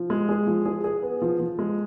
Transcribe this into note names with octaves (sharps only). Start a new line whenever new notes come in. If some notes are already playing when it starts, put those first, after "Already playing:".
Already playing: F3
G#3
G#4
F3
G#4
G#4
B3
F3
F3
G#3